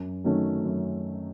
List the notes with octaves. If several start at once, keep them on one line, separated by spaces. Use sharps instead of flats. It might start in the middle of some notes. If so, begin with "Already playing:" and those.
Already playing: F#2
D#3 F#3 A3 C#4
F#2